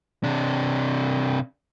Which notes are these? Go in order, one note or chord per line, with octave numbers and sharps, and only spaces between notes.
C3 D4